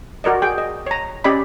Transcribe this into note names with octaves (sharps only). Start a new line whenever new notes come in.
F#4 A#4 D5 D#5
G#4 G5
D#5
C#5 A#5
C#4 G4 D5 D#5 B5